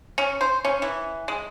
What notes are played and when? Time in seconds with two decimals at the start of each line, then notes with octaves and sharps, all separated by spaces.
0.18 C#4
0.41 C5
0.65 C#4
0.82 E3
1.28 G#3